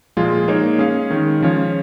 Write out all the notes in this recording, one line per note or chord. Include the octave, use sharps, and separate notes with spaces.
A#2 F3 G#3 F4 G#4
A#3 D#4 G#4 C#5 F5
G#3 C#4 G#4 F5
D#3 G#3 C#4
C#3 F3 C#4 F4 C#5